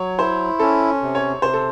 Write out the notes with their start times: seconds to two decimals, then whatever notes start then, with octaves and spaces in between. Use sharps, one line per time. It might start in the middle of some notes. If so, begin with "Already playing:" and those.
Already playing: F#3 C#5
0.19 E4 C5
0.60 C#4 A4
1.02 C3
1.15 C#5
1.42 C3 C5
1.54 A4